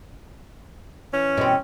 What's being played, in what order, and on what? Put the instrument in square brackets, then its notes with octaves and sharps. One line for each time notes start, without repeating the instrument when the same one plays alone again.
[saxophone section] E3 C#4
[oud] B2 C4